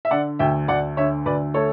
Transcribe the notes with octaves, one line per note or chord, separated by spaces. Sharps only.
E5
D3 D5 F#5
D2 E5 G5
D2 D5 F#5
D3 C#5 E5
D2 B4 D5
A3 A4 C#5